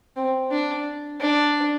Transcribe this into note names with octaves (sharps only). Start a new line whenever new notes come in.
C4
D4
D4